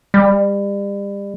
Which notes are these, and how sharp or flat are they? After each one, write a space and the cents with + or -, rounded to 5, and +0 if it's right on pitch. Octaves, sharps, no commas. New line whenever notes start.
G3 +35